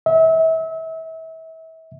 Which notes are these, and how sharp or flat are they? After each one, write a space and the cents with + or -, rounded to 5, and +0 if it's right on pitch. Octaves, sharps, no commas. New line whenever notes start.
E5 -30